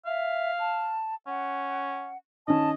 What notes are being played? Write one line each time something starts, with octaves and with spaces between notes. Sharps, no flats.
E5 F5
A5
C#4 F#5
D#3 C#4 D#5 A5